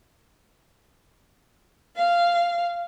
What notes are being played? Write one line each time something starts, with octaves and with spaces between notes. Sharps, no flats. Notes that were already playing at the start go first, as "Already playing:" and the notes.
F5